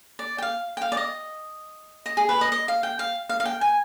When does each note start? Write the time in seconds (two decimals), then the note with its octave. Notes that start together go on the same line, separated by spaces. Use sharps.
0.19 D5
0.38 G5
0.42 F5
0.77 G5
0.82 F5
0.92 D5
0.97 D#5
2.06 D#5
2.17 G#4
2.29 B4
2.41 D#5
2.52 D#5
2.68 F5
2.83 G5
2.99 F5
3.29 F5
3.40 F5
3.45 G5
3.61 G#5